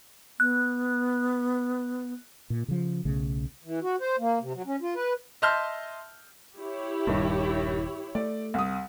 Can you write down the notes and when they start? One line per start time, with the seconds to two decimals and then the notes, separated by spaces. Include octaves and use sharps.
0.40 B3 F#6
2.50 A#2
2.68 C#3 F3
3.05 B1 C#3 A3
3.64 E3
3.82 F#4
4.00 C5
4.19 A#3
4.41 C3
4.54 F#3
4.67 C#4
4.82 F4
4.95 B4
5.42 D#5 E5 A5 C6 F6 G6
6.57 E4 G4 C#5
7.07 D#1 G2 D#3
8.15 A3 D5
8.54 C2 D#6